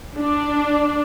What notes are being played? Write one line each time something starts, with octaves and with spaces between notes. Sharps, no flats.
D4